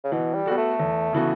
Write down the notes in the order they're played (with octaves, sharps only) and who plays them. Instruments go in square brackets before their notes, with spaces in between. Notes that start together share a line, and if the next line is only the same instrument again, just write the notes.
[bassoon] C#3
[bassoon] B2 [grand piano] E3
[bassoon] G3
[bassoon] G3 [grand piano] B3 F#4 A4
[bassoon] A3
[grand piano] E2
C#3 E3 B3 F#4